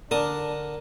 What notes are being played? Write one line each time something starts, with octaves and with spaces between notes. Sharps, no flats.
D3 D4 A#4 A5 D#6